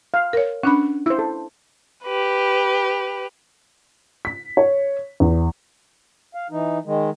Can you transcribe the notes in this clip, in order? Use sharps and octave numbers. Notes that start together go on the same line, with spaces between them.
F5
A#4 C#5
C#4 D4 F#5 B5
E4 C5 E6
A4
G4 B4
B6
C#5
E2
F5
E3 D#4
D#3 G#3